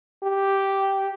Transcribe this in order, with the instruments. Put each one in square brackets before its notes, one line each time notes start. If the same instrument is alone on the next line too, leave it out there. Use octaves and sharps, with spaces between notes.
[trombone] G4